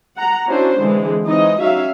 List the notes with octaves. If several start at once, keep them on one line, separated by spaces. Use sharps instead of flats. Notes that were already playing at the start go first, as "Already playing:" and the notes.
F#5 A#5
C#4 D4 E4 F#4 C5
D3 E3 G#3 C4
E3 G#3 C4 D#4 D#5
F#3 C#4 D#4 E5 F5